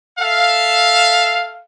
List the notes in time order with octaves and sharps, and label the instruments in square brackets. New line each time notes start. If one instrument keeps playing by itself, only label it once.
[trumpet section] A4 E5 F5